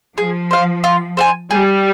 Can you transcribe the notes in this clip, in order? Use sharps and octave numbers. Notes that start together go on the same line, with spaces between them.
F3 G#4
C5 F5
F4
C5 F5 G#5
G3 G#4